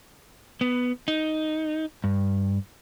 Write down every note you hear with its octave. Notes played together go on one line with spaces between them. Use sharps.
B3
D#4
G2